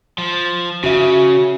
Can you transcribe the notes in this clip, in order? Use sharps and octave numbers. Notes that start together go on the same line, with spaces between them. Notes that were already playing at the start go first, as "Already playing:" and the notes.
F3
C#3 F#4 E5